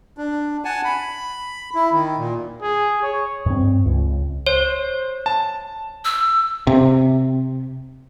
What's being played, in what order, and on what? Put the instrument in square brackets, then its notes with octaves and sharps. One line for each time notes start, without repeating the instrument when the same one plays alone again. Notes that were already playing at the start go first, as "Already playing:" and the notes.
[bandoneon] D4
F#5 G#5 A5
B5
E4
D#3
A#2
[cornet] G#4
C#5
[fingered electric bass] G2 C4
C#2
[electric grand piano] C5 [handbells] C#5
[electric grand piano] A5
[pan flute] E6
[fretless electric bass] C3